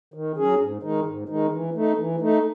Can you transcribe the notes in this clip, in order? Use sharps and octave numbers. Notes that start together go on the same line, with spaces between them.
D#3
F#3 C#4 G#4
G#2
D#3 G#3 D#4
G#2
D#3 G#3 D#4
E3
A3 D#4
E3
A3 D#4